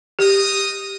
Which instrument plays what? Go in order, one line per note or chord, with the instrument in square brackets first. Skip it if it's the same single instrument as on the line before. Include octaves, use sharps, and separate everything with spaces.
[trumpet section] D#4 D#5 D#6 [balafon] G4